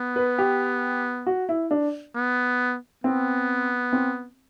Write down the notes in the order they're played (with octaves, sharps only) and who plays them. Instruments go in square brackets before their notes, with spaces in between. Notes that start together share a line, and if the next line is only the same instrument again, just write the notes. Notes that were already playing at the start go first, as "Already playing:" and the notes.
Already playing: [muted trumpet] B3
[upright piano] B4
G4
F#4
E4
D4
[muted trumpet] B3
[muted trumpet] B3 [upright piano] C4
[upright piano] C4